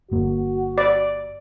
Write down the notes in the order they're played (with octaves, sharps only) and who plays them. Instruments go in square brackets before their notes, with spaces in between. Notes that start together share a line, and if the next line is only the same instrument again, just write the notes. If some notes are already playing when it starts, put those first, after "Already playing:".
[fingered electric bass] G1 A#3 [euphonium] F#4
[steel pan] D5